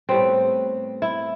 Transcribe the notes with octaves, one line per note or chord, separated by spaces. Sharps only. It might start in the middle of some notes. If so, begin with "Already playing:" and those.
A2 G3 B3 C4
E4